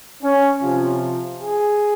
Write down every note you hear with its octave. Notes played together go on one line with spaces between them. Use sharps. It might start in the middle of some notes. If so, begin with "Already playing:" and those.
C#4
C3 F3 F4
G#4